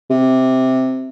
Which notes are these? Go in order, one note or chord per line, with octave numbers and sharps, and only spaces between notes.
C3